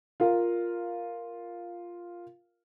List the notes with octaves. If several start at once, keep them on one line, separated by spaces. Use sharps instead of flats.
F4 A#4 F5